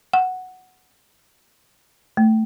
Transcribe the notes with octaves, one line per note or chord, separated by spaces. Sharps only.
F#5
A3